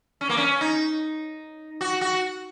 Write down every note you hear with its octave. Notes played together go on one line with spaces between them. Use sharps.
C#4
A#3
C#4
D#4
F#4
F#4